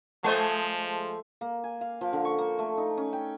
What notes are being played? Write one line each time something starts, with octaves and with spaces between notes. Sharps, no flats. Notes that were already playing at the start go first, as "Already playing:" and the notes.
F3 G#3 A3 G#4 C5 D#5 A5 C6
A#3
G#5
F5
F3
D3
C#6
A#3
A3
D#4
C#4
G5